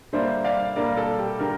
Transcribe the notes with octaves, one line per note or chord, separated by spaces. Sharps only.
D3 G3 A#3 D4 C5 E5
D5 F5
D3 G3 A#3 D4 A#4 D5
A4
G4
D3 G4 A#4